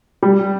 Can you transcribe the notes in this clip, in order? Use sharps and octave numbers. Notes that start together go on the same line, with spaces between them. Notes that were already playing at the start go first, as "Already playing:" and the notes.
G3